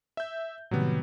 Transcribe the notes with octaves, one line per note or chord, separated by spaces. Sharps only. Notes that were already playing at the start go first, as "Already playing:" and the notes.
E5 G6
A2 C3 D#3 F#3 G3 B3